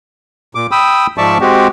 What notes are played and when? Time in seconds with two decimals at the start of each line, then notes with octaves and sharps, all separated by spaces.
0.55 A#2 D6
0.71 G5 B5 D#6 E6
1.18 G#2 F3 D5 E5 A5 C#6
1.41 G#3 C4 F#4 G4